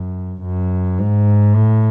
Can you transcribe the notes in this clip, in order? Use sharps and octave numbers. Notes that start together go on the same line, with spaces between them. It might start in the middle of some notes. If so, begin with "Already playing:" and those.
Already playing: F#2
F#2
G#2
A2